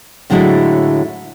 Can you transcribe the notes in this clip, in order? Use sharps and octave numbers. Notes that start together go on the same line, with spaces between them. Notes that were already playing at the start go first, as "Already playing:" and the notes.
A2 D3 F#3 G#3 D4 E4